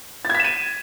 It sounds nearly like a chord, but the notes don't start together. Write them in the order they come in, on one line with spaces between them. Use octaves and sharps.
A6 G#6 B6 E7 D#7